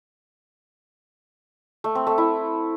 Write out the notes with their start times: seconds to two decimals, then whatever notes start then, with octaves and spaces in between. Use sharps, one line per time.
1.84 A3
1.95 C4
2.07 A3
2.18 E4